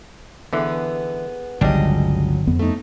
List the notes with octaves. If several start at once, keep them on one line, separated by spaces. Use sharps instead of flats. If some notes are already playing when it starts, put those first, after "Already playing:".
D3 E3 B3 G#4
G1 C#2 C#3 F#3 G3 D4 D#5
F2 B3
A3 D#4